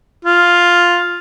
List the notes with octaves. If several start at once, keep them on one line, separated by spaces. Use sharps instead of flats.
F4